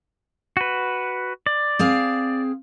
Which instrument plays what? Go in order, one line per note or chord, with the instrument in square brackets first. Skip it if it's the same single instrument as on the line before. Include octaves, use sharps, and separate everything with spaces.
[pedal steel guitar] F#4 B4
D5
[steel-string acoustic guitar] C4 G#4 F5